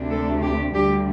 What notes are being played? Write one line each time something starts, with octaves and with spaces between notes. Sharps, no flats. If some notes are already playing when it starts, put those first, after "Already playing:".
Already playing: D2 C3 A3 D4
A4
G4
D2 D3 G3 G4